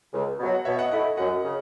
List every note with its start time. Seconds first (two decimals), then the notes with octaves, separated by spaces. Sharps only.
0.13 C#2
0.39 B2 F#3
0.54 F#5
0.65 B2 C#5 E5
0.79 D#5 F#5
0.91 A3 E4 D#5 F#5
1.17 F#2 D#5 F#5
1.44 C#3